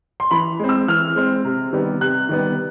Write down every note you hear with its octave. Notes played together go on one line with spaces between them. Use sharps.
C6
E3 B5
G#3 C4
E6
E3 F6
G#3 C4
C3
D#3 G3 B3
C3 F#6
D#3 G3 B3